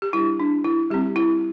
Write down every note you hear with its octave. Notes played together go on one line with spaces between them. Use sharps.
G4
G3 D4 E4
D4
E4
G3 C4 G4
E4